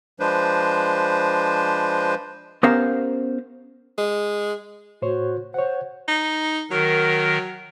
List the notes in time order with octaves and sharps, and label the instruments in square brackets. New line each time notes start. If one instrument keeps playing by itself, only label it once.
[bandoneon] F3 G#3 D4 B4 C5
[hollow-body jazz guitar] B3 C#4 G4 A#4 C5 F5
[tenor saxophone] G#3
[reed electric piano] A2 C5 C#5 [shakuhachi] F#4
[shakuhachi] C5 [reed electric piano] C#5 F#5
[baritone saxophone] D#4
[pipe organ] D#3 A#4 [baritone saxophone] F#3